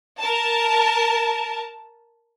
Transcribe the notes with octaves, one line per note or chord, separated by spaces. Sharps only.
A#4 A5